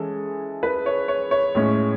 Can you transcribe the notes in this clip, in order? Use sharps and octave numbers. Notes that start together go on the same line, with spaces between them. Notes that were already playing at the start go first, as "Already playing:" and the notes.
Already playing: E3 G#3 C#4 A4
B4
C#5
C#5
C#5
A2 G#3 C#4